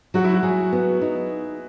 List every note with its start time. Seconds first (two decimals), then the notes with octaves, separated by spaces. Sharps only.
0.14 F#3 F#4
0.24 E4
0.34 F#4
0.43 F#3 G#4
0.72 B3
1.02 D#4